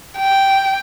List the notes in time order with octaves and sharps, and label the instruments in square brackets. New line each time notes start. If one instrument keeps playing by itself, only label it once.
[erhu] G5